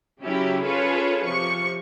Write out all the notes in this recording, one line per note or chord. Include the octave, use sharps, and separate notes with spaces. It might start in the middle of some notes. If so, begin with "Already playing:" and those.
C#3 F#3 C#4 E4 G4
C#4 F4 G#4 A4 B4 C#5
C3 F3 C#6